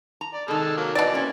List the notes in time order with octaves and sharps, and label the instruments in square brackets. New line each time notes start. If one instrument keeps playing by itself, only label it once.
[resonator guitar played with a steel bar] A#5
[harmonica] D5
[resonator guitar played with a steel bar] C3 D#3 [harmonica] G#3 A4
[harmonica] F#3 A#3
[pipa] B2 D5 [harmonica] E3
[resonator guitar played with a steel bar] A#3 C4 C#4